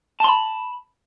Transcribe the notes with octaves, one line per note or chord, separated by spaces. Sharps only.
A5 B5 C6